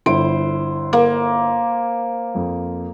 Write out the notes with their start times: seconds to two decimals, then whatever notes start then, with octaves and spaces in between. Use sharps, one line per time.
0.06 G1 E4 C5 D7
0.93 A#3
2.35 F2